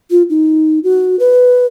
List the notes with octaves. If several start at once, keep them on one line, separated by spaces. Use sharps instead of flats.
F4
D#4
F#4
B4